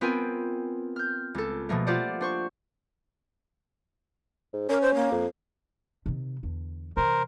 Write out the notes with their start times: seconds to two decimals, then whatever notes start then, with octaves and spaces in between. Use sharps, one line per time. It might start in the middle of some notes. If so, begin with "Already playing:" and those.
0.01 B3 C4 F4 A#4 G5 G#5
0.96 F6 G6
1.34 C#2 A4
1.69 B2 F3 A3 A#3
1.86 F4 G4 C5 D5 F#5
2.21 D4 C5 C#6
4.53 G#2
4.69 C#4 A#4
4.81 C5
4.94 A#3
5.12 F2
6.06 C3 D#3
6.43 E2 D3
6.97 C3 E3 A#4 C5